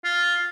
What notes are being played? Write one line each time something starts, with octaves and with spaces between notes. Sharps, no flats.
F4